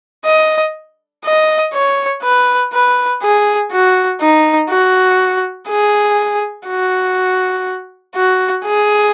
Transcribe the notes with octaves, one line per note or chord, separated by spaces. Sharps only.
D#5
D#5
C#5
B4
B4
G#4
F#4
D#4
F#4
G#4
F#4
F#4
G#4